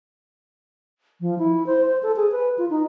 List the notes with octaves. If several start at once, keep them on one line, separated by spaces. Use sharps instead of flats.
F3
E4
C5
C5
A4
G#4
B4
F4
D#4